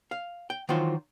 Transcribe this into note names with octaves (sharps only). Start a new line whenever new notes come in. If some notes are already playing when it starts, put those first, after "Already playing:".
F5
G5
D#3 E3 F#3 F4 C5